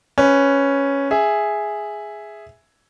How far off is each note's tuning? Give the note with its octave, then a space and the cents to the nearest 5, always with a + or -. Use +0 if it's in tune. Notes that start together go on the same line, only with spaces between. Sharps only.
C#4 +0 B4 +0
G#4 +0 E5 +0